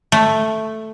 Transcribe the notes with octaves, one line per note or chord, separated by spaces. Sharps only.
A3